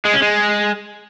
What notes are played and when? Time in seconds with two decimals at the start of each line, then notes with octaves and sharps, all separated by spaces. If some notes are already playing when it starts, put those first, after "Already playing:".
0.05 G#3
0.13 C#4
0.22 G#3